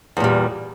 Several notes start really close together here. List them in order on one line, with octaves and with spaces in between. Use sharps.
E2 A#2 G3